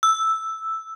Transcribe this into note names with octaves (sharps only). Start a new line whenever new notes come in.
E6